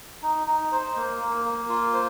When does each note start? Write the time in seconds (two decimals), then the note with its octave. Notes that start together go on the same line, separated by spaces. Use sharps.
0.23 D#4
0.47 D#4
0.72 C5
0.96 A#3
1.21 A#3
1.45 A#3
1.69 F4
1.93 C5